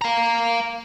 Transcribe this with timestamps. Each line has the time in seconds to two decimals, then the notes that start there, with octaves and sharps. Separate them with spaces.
0.02 F5 A#5